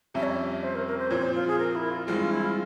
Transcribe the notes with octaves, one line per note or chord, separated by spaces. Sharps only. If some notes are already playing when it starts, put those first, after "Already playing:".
F2 C3 G3 C#4 E5
C#5
E5
C5
A#4
A#4
C5
A#2 F3 C4 C#5
C5
F4
G#4
A#4
E4
F4
G2 E3 G#3 C4 F4
F4
E4
F4